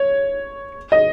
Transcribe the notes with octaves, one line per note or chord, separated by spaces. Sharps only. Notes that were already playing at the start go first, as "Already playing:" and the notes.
Already playing: C#5
D#5